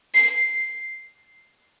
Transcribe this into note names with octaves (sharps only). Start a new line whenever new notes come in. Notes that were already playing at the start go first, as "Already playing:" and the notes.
C7